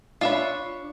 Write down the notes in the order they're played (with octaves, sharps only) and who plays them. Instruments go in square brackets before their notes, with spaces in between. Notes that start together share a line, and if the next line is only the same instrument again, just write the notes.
[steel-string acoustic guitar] D4 C#5 [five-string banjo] F4 E5 B5